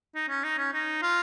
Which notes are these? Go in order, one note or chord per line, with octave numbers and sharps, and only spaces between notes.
D#4
C#4
D#4
C#4
D#4
F4